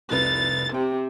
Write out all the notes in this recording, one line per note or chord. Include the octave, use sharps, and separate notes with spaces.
F1 C2 B4 A6
C3 G5